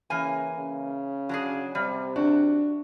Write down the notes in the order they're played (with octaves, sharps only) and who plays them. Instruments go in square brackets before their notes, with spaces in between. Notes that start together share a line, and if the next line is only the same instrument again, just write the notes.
[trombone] C#3 [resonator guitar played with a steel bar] E3 A#3 G#5
[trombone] C#3
[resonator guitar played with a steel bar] F#3 D4 G#4
[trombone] C3 [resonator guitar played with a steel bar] G3
[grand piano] D4 [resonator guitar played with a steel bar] F#4